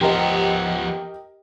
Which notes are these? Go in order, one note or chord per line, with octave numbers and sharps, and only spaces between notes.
F3 B3 G4 A#4 D#5